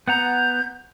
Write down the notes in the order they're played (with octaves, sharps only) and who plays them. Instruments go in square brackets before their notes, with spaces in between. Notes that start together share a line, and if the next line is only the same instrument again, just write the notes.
[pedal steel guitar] B3 F#5 A#5 [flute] G6